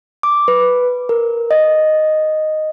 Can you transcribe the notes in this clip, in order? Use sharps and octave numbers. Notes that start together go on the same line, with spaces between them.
D6
B4
A#4
D#5